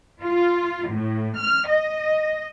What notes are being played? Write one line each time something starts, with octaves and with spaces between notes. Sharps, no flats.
F4
A2
F6
D#5